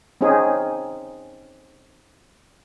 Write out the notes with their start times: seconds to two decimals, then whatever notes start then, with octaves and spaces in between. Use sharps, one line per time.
0.21 C4 C#4 D#4 G#4